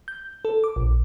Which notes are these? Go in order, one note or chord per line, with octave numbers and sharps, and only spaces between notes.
G6
A4
D6
A#1